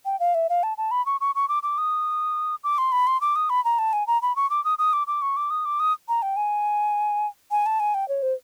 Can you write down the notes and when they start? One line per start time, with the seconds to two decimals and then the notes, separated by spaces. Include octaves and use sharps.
0.06 G5
0.20 F5
0.35 E5
0.50 F5
0.63 A5
0.78 A5
0.91 B5
1.06 C#6
1.21 C#6
1.35 C#6
1.49 D6
1.63 D6
1.78 D#6
2.64 D6
2.78 C6
2.92 B5
3.07 C6
3.21 D6
3.36 D#6
3.50 B5
3.65 A#5
3.79 A5
3.93 G#5
4.07 A#5
4.22 B5
4.36 C#6
4.50 D6
4.65 D#6
4.79 D#6
4.93 D6
5.07 D6
5.22 C#6
5.37 D6
5.50 D#6
5.65 D6
5.80 D#6
6.08 A#5
6.22 G5
6.36 G#5
7.51 G#5
7.66 A5
7.80 G#5
7.94 G5
8.09 C#5
8.23 C5